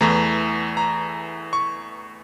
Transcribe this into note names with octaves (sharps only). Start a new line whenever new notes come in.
E2 E3 A3 A#5
A#5
C#6